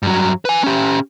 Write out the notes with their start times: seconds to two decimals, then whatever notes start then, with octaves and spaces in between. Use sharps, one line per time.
0.03 G2 F#3
0.45 B4 G#5
0.64 C#4 G4